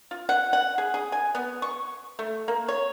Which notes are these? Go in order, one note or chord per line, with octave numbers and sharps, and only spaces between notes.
F4
F#5
F#5
G#4
G#4
G#5
B3
C#6
A3
A#3
C#5